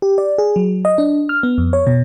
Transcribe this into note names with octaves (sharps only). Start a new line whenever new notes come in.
G4
D5
G#4
F#3
D#5
D4
F6
B3
F2
C#5
B2